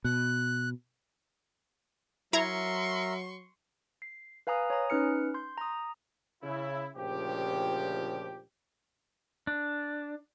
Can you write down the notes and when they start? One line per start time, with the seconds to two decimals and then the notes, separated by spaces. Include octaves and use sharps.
0.04 B2 F#6
2.33 F#3 E4 A#4 E5 A#5 C6 C#6 G#6
4.02 C7
4.47 B4 F5 G#5 A#5 D#6
4.70 C#5 G#5 A#5 D#6
4.90 C#4 D#4 B4 F6 C#7
5.34 C6 G6
5.58 A#5 D#6
6.43 C#3 E4
6.96 D2 A#2 C#3 F3 G4
9.47 D4